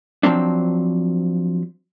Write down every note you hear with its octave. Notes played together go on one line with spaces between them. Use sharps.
F3 F#3 C4 D4